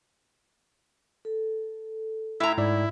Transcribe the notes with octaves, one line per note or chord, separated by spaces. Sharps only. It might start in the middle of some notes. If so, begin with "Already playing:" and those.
A4
A2 E4 E5 A#5
G#2 E4 D5